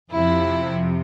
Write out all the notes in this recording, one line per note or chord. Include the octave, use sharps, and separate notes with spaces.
F2 C3 F3 E4